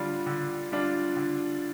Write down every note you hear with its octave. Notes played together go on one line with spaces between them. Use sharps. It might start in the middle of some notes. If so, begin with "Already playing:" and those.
Already playing: D3 G3 D4 F4
D3
G3 D4 F4
D3